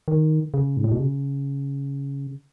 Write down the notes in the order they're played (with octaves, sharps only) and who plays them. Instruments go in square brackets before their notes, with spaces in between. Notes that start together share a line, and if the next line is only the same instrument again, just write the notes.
[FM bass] D#3
C#3
G#2
A2
B2
C#3